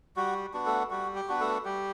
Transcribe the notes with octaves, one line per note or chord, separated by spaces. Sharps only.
G3 F#4
B3 D4 F#4
A3 A4
G3 F#4
G4
B3 D4 F#4 B4
A3 A4
G3 G4